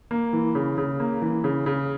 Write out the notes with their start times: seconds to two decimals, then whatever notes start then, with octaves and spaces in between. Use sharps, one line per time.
0.11 A#3
0.33 E3
0.55 C#3
0.78 C#3
1.00 A#3
1.22 E3
1.44 C#3
1.66 C#3